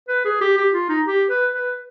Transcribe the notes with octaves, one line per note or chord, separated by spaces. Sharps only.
B4
G#4
G4
G4
F4
D#4
G4
B4
B4